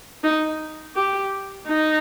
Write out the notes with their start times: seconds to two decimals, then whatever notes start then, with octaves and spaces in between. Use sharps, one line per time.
0.24 D#4
0.95 G4
1.67 D#4